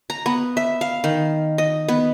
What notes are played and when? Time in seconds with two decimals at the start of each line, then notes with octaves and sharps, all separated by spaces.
0.10 A#5
0.26 B3
0.57 E5
0.81 F5
1.04 D#3
1.58 D#5
1.88 B3